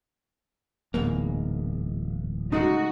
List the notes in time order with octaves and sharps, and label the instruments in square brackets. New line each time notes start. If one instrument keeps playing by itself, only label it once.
[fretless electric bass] D1 [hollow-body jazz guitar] E2 G#2 A#3
[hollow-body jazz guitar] C#3 G#3 A3 [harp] D#4 [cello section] F#4